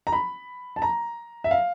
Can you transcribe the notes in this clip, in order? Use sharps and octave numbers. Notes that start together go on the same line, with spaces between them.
A#5
B5
A5
A#5
E5
F5